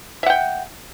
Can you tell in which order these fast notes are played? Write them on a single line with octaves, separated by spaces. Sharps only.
E5 F#5 G5